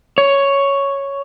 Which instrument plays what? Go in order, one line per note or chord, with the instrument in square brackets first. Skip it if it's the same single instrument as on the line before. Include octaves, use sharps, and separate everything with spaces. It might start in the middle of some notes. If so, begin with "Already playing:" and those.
[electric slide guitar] C#5